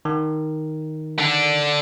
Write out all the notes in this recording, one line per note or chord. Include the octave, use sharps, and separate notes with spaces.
D#3
D3 D4